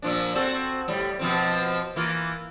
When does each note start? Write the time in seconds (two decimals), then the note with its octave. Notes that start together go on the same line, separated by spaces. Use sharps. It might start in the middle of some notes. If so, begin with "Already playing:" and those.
0.02 A#2 F3 D4
0.35 C4 F#4 A4
0.88 A2 G3
1.19 B2 F3 C4
1.96 E3 A#3 F4